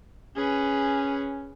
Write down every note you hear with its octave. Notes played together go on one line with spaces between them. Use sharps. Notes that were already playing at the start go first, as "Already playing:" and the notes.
C#4 G#4 B4